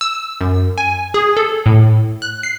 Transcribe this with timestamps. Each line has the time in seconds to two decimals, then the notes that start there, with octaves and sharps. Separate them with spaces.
0.01 E6
0.40 F#2
0.78 G#5
1.14 G#4
1.37 A4
1.66 A2
2.22 F#6
2.43 C7